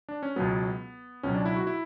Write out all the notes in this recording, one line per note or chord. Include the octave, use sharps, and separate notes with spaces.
D4
C#4
C#2 B2 F#3 B3
C#2 B2 F#3 C#4
D4
E4
F#4
E4